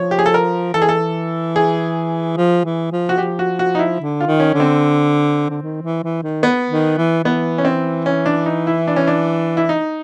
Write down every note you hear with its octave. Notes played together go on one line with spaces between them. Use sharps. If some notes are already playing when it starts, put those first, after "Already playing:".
Already playing: F3 C#5
G4
G#4
A4
A#4
E3 A4
G#4
A4
G#4
F3
E3
F3
F#4
F3 G4
F#4
F#4
D#4
E4
D3
F4
D#3
C#4
D3
C4
D3
D#3
E3
E3
D#3
B3
D#3
E3
E3 B3
C#4
C4
C#4
D4
D#4
E4
D4
C#4
D4
E4
D#4